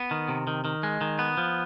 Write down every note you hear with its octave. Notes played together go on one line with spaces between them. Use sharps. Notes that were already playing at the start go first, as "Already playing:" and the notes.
Already playing: B3
D#3
C3
D#3
D#3
G#3
D#3
B3
F3